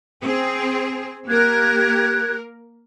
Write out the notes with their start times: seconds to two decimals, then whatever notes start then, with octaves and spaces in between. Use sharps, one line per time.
0.23 C4 G#4
1.28 A#3 G4 A#4 F#6 G#6